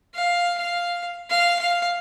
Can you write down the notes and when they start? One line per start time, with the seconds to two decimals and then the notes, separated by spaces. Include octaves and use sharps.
0.14 F5
0.58 F5
1.30 F5
1.59 F5